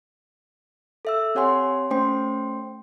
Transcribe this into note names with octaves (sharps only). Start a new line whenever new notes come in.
A4 E5 E6
C4 G4 C#5 F#5 G#5 C6
A3 C#4 C5 G5 C6